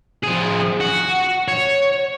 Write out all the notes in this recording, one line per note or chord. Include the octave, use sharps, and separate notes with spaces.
F3 G#4
F#4
C#5